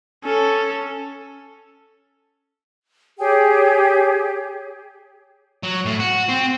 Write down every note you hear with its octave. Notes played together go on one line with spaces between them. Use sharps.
C#4 A4
G4 G#4 C#5 G5
F#3
A2
F#4
C4